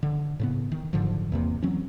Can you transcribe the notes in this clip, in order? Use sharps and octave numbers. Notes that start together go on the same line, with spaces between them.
D3
A2 C#3 B3
D#3
F#1 G#2 D3 F3
E2 C3 A#3
E3 F#3 C4 C#4